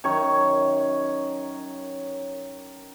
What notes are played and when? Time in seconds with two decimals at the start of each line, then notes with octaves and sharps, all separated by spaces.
0.04 F#2 D#3 C#5 C#6